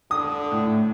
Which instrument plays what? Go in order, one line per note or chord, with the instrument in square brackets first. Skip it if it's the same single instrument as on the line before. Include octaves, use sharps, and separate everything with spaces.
[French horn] D3 [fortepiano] D#6
[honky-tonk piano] A2